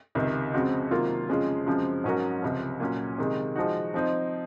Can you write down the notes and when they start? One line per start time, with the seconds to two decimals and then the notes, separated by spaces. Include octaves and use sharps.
0.15 C#2 C3 D#3
0.54 F2 C#3 G#3 C4 F#4
0.91 C3 D#3 F#3 A#3 F4
1.29 F2 C#3 G#3 C#4 F4
1.66 F#2 C#3 F3 G#3 C4
2.04 G#2 F#3 C#4 F#4 A#4
2.42 C#2 C3 F3
2.80 A#2 F#3 C#4
3.18 C3 D#3 G#3
3.56 F3 G#3 D#4 F#4
3.94 F3 C4 D#4